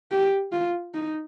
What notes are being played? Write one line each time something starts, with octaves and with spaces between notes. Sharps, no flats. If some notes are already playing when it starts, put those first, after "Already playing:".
G4
F4
D#4